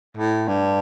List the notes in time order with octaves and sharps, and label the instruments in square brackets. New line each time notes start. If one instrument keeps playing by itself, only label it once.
[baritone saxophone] A2
G2